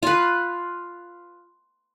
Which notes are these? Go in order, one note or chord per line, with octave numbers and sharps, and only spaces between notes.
F4 B4